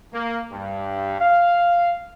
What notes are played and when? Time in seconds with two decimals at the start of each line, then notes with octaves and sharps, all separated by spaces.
0.13 A#3
0.51 G2
1.20 F5